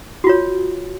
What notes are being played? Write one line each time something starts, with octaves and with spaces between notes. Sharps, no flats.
F4 F#4 C#5